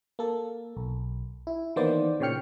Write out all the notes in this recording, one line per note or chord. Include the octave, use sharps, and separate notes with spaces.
A#3 A4
B1
E4
D#3 E3 A#3 B3 C5 D5
A#2 C#3 C#5 G5 F6 C#7